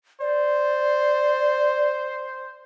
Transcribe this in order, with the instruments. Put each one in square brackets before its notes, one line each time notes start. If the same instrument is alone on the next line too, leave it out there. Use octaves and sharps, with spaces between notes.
[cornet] C5 [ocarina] D5